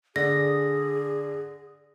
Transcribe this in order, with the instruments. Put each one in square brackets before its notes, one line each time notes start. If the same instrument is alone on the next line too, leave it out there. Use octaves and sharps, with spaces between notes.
[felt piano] D3 [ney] G#4 [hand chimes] A#6